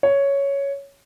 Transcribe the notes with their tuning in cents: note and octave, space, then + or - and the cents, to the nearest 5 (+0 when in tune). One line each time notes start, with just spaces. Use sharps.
C#5 +5